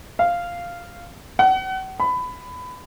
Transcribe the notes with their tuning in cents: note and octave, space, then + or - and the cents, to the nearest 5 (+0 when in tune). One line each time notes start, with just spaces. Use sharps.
F5 -5
F#5 +35
B5 +20